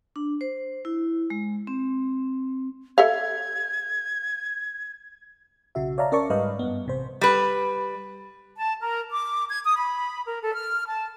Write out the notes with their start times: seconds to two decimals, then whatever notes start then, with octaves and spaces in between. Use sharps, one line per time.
0.16 D4
0.41 C5
0.85 E4
1.30 G#3
1.67 C4
2.98 A4 E5 F5 G#6
5.75 B1 C#3 F#4 E5
5.98 C#5 D5 E5 F5 A5 A#5
6.12 C#4 A#4 D5 A5 C#6
6.30 G#2 G3 B4 D#5 F5
6.59 G2 B3
6.86 A1 C3 C5
7.21 G3 B4
8.57 A5
8.81 A#4
9.11 D6
9.49 G#6
9.64 D#6
9.76 B5
10.26 A#4
10.43 A4
10.55 F6
10.87 A5